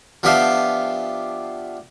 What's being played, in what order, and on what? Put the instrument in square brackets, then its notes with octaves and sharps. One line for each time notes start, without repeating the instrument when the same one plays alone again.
[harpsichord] F3 B3 D4 G4 E5 F5